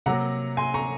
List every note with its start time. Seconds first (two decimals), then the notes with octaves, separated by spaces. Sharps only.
0.06 C3 F#3 A#3 F#5 A#5
0.57 G#5 C6
0.74 A#5 C#6